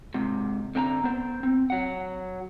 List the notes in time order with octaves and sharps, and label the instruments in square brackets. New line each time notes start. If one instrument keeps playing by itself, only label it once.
[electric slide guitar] G#2 C3
D3 C4 A5 A#5
B3 C5
C4
F#3 F#5